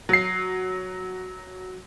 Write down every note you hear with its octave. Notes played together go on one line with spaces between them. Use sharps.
F#3 C7